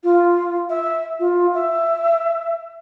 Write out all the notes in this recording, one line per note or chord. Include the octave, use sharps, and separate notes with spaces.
F4
E5
F4
E5